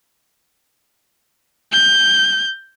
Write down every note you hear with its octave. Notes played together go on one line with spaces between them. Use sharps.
G6